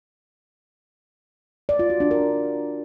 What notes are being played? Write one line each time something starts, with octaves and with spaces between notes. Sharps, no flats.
D5
F4
F#4
D4
A#4